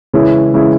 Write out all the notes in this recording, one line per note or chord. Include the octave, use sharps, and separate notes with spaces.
C#3 E3 G#3 C#4 E4
C#3 E3 G#3 C#4 E4